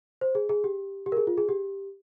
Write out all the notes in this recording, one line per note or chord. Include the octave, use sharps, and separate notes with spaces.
C5
G#4
G#4
G4
G4
A#4
G#4
F4
G#4
G4